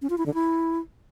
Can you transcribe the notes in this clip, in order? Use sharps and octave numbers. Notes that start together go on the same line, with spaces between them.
C#4
F4
E4
D3
E4